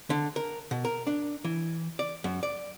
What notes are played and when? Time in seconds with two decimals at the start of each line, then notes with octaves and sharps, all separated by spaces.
0.10 D3
0.36 A#4
0.71 B2
0.85 A#4
1.07 D4
1.44 E3
1.99 D5
2.24 F#2
2.43 D5